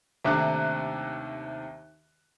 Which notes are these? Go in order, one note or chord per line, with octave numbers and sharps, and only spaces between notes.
D#2 C3 A3 D4 D6 F#6